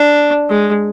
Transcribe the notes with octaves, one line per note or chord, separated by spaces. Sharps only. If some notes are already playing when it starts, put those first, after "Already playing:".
Already playing: D4
G#3